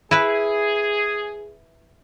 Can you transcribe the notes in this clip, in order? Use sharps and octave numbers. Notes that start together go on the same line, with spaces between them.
E4 G#4 B4